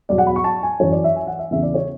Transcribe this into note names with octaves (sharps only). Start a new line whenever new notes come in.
E2 B2 F#3 D5
F#5
B5
C#6
A5
G#5
F#2 E3 C#5
D5
E5
G#5
F#5
E5
E2 C#3 E3 E5
D5
C#5